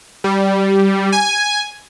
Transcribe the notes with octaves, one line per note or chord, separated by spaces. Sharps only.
G3
G#5